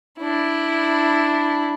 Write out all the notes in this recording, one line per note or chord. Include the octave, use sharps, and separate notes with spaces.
D4 E4